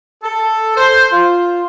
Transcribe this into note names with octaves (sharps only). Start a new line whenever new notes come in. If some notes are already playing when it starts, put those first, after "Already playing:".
A4
C5
F4